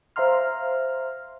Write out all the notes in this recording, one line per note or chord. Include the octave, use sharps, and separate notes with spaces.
C5 E5 F5 A#5 C6 F6